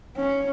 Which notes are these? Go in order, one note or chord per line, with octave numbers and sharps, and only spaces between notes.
C#4